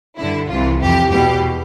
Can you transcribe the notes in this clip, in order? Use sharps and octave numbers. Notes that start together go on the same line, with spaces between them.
G2 D3 E4
C2 C3 E3 F4
F2 E3 G4
E2 B2 G4